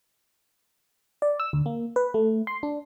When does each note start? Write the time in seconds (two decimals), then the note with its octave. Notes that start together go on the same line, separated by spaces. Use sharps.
1.22 D5
1.40 E6
1.53 D2
1.66 A#3
1.96 B4
2.14 A3
2.47 C6
2.63 D4